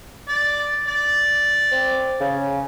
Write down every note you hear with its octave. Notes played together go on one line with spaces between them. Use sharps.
D5
D5
C4
C#3